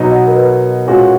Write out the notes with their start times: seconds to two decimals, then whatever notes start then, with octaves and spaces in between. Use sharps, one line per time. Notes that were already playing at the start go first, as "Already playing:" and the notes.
Already playing: B2 F#3 B3 D#4
0.11 D#5 F#5
0.27 A#4
0.37 B4
0.87 A#2 G#3 C#4 F#4